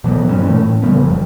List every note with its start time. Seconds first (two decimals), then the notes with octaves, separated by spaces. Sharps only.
0.04 B2 E3 F#3 B3
0.28 G2 A#2 E3 C#4
0.48 B2 A3
0.61 A2
0.82 C#3 F3 G3 B3
1.02 F#1 E2